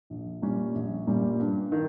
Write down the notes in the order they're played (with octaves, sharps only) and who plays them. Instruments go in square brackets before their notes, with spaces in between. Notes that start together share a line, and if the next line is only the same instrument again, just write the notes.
[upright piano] A#1
A#2 G3 C#4
A#1
A#2 G3 C#4
G2
D#3